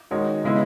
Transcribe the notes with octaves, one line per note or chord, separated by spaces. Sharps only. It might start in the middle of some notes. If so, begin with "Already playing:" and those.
D#3 G#3 D#4 F#4 C#5
C#3 G#3 B3 E4